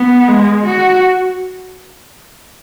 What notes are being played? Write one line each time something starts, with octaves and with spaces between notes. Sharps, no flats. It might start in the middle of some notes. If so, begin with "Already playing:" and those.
Already playing: B3
G#3
F#4